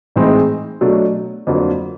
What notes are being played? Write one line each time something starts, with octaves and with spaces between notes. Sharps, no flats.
A2 E3 G#3 C4 D#4
B2 F#3 A3 D4
F2 D3 F#3 A#3